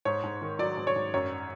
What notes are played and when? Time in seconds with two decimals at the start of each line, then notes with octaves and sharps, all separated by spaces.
0.05 G#2 C#5
0.24 G#2
0.42 D#3
0.59 F#3 D5
0.77 G#2
0.87 C#5
0.96 G#2
1.14 F#2 C#5